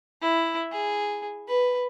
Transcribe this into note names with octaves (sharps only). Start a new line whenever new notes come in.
E4
G#4
B4